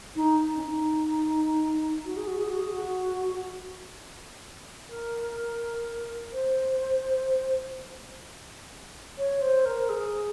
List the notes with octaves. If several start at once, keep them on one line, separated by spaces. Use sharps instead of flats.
D#4
C#4
D#4
F#4
G#4
F#4
G#4
F#4
G#4
F#4
A#4
C5
C#5
C5
A#4
G#4